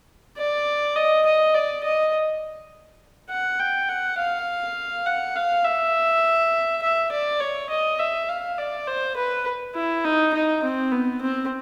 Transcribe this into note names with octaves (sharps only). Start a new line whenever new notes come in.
D5
D#5
D#5
D5
D#5
F#5
G5
F#5
F5
F#5
F5
E5
E5
D5
C#5
D#5
E5
F5
D5
C5
B4
E4
D#4
D#4
C4
B3
C4